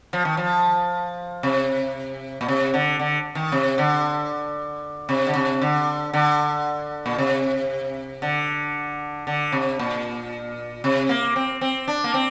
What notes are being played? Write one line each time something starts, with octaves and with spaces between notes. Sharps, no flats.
F3
D#3
F3
C3
A#2
C3
D3
D3
D#3
C3
D3
C3
D3
C3
D3
D3
A#2
C3
D3
D3
C3
A#2
C3
A#3
C4
C4
D4
A#3
C4